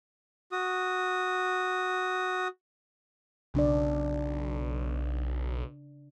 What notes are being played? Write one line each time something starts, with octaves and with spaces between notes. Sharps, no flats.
F#4 D#6
B1 C#3 D4 D5